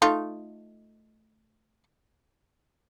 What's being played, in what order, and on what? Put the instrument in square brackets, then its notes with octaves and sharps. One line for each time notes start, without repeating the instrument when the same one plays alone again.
[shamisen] A3 D#4 F4